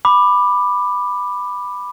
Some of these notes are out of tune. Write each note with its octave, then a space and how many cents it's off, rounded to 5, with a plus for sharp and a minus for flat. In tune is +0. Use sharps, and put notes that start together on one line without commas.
B5 +0 D6 +15